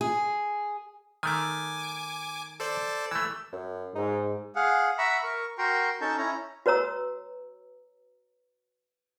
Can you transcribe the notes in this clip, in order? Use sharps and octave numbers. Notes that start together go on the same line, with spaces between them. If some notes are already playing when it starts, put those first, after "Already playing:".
G#4
D#3 A3 G#5 D6
A4 C5 D5
E3 A3 E6
F#2
G#2 D#4
G#4 F5 F#5
E5 F#5 A#5 B5 C#6 E6
A#4 C#6
F#4 A#4 G5 A#5 C6 C#6
C#4 D#4 A4 A5 C#6 G6
C#4 E4 C#5 A#5
F#4 B4 C#5 A#5 E6